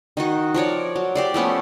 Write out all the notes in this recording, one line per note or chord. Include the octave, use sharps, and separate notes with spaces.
D#3 D#4 F#4
F3 A#4 C#5 D5
F#3
G4 C5 D5
F3 A3 B3 C#4